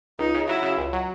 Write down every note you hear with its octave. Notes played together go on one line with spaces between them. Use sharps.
C#2 D#4
C#3
F#3 E4
C#3
C#2
F#3